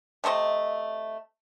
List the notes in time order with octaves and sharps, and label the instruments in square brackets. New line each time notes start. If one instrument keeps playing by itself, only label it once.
[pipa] C3 A3 C5 D#5